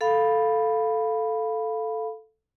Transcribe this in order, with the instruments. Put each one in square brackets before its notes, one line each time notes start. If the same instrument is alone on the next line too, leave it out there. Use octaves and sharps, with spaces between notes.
[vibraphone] A4 F5 B5